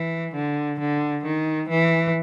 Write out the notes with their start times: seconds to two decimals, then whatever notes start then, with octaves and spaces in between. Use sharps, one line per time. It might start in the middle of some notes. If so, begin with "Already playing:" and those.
Already playing: E3
0.35 D3
0.80 D3
1.25 D#3
1.69 E3